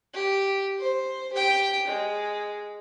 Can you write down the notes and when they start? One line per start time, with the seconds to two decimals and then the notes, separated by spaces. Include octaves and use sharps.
0.14 G4
0.79 C5
1.33 G4 G5
1.87 G#3